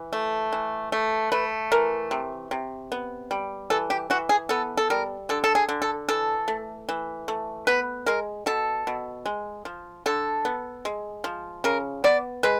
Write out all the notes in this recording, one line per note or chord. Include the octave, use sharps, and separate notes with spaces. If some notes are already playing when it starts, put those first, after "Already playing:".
Already playing: E3
A3
E3
A3
A3 B4
E3 A#4
C3
C3
B3
G3
E3 A4
G4
E3 F#4
G#4
B3 A4
A4
G3 A#4
D3 A4
A4
G#4
D3
A4
E3 A4
A3
E3
A3
B3 B4
G#3 A#4
B2 A4
B2
G#3
F3
D3 A4
B3
G#3
F3
C#3 A#4
B3 D5
G#3 B4